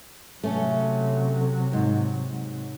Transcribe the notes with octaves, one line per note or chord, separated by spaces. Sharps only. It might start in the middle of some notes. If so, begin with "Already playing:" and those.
C3 F#3 A3 C#4
G#2